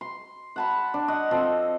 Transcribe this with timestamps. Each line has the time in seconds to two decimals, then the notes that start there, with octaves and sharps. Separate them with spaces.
0.01 C6
0.56 F#5 A5 B5
0.94 D4
1.08 D#5 F#5
1.31 F3 C4 A4